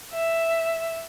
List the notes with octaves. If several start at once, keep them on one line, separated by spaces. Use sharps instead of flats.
E5